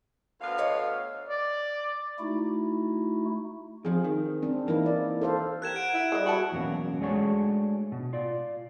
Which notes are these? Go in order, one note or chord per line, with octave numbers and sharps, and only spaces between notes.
D2 B3 F5
A4 C#5 D#5
D5
A3 D#4 E4 F#4
F2 F3 C4 G#4
D#3
C4 D4
E3 A#3 D#4 E4
D5
A4 C5 F5
G4 A#4 F#6 G#6 E7
F#5 D7
E4
G3 G#4 D#5
F#4 A5 B5
E2 B2 F#3 A#3 C#4
G#3 A3 D4 F#4 G#4 C#5
B2
F4 D5